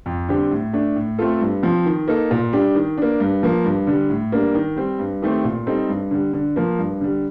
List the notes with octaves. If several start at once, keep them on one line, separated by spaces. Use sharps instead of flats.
F2
D3 G3 C4 G4
A2
A3 D4
A2
A3 C4 F4 A4
G2
F3 C4
D#3
A#3 D#4 A4
A#2
G3 D4 G4
D#3
A#3 D4
G2
F3 A#3
G2
D3 G3
A2
G3 A#3 D4
D#3
G3 C4
G2
D#3 A3 C4 G4
A#2
G3 C4 D#4 A4
G2
D3 G3
D3
F3 A#3
G2
D3 G3